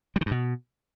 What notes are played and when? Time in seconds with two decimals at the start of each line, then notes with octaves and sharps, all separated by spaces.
0.16 G3
0.21 D#3
0.26 G2
0.31 B2